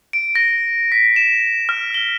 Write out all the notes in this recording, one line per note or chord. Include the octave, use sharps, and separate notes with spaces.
D7
A#6
B6
E7
F6
G7